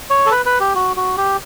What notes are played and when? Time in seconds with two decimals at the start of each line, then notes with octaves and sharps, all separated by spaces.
0.10 C#5
0.26 A4
0.31 B4
0.46 B4
0.60 G4
0.75 F#4
0.97 F#4
1.17 G4